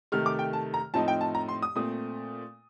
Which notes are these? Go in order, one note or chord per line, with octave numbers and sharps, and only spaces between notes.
C3 D#3 A3 F6
D6
G5
A5
A#5
A2 F3 C4 D#4 A5
G5
A5
A#5
C6
D#6
A#2 A3 C4 D#6